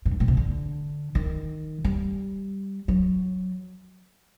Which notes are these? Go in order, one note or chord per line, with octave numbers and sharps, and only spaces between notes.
A2
G#2
A2
C3
D3
D#3
G3
F#3